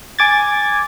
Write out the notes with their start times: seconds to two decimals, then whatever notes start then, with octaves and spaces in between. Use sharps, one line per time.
0.19 G#5 D6 G#6 A6